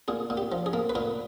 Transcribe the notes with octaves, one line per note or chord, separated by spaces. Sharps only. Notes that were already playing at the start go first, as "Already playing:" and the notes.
A#2 G#4
A#2
G4
F3
G#4
A#3
B4
A#2 A#4